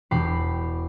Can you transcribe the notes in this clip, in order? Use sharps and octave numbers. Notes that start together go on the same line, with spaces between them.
E1 G4 B5 C7